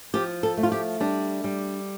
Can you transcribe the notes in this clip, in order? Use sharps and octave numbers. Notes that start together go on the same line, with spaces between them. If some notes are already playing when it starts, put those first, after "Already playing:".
F3 G4
A4
A3
F4
G4
G3 D4
G3